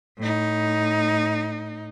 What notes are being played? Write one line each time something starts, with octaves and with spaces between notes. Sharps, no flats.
A2 D#4